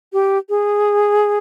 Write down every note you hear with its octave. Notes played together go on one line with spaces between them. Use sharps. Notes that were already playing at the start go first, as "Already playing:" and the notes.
G4
G#4